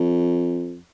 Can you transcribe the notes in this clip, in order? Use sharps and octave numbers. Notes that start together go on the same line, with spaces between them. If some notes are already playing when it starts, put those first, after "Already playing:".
Already playing: F2